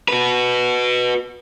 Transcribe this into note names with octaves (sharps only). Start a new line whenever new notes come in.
F#4 B4